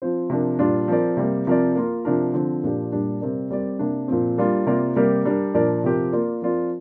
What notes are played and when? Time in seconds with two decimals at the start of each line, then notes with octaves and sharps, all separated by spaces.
0.02 F3 C4 F4 C5
0.30 C3 F3 D4 A#4
0.59 A#2 G3 D4 F4
0.88 F3 C4 A#4 D5
1.17 C3 G3 A#3
1.47 C3 F3 C4 A#4 D5
1.76 A#3 F4 A#4
2.05 C3 F3 D4 A#4
2.34 D3 F3 C4
2.64 A#2 F3 D4 G4
2.92 A#2 G3 D4
3.21 C3 G3 C4 A#4 D5
3.51 G3 C4 A#4 D5
3.79 C3 A#3 D4
4.08 A#2 F3 C4
4.38 G3 A#3 D4 F4
4.67 C3 A#3 F4 A#4 D5
4.96 C3 G3 A#3 G4 A#4
5.25 G3 D4 A#4
5.54 A#2 F3 D4 A#4 D5
5.84 C3 F3 C4 G4 A#4
6.13 A#3 F4 D5
6.42 F3 C4 F4 A#4 D5